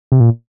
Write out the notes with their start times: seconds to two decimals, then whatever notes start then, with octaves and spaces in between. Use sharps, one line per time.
0.12 C3
0.20 A#2